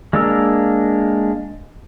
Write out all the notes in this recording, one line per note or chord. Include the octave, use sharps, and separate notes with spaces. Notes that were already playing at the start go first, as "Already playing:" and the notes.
G#3 A#3 D4 A#4 E6